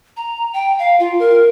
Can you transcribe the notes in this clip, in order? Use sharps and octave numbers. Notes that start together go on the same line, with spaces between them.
A#5
G5
F5
F4
A#4